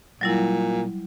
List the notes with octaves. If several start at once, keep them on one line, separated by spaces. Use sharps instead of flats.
A#2 F#3 G3 E4